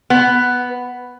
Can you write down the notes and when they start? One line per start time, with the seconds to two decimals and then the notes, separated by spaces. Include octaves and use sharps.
0.10 B3